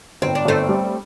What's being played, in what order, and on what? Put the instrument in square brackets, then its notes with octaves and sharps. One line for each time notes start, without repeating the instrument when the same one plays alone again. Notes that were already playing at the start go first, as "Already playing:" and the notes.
[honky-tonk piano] G1 [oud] C4
[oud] D4
[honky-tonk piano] G1 [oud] A3 C4
[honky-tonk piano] G3